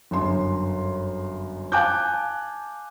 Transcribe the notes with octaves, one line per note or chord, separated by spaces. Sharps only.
G1 F#2 C6
F5 G#5 A5 D6 F#6 G6